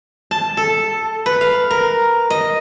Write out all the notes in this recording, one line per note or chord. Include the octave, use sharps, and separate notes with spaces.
A5
A4
B4
F5
A#4
D#5